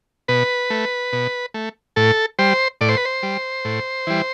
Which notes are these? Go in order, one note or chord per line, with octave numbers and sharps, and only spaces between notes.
B2 B4
A3
B2
A3
A2 A4
G3 C5
A2 D5
C5
B4
C5
G3
A2
E3 G3